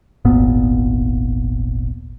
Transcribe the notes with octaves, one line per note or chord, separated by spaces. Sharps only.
D#1 G#1 A#2 B3